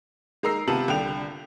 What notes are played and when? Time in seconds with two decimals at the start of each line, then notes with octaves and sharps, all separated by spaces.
0.43 G#3 D#4 A#4 A#5 E6 C7
0.67 C3 B3 F4 A5 F#7
0.88 C2 D3 G5 F7